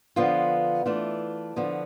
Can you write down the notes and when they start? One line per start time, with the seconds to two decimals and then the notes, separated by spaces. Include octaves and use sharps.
0.16 D3 F3 B3 F4
0.86 E3 A3 D4 F4
1.56 D3 F3 B3